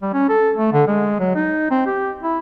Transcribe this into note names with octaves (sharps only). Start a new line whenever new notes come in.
G3
C#4
A4
A3
D3
G#3
F#3
D#4
C4
G4
E4